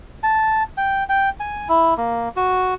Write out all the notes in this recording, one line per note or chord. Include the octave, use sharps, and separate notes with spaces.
A5
G5
G5
G#5
E4
A#3
F#4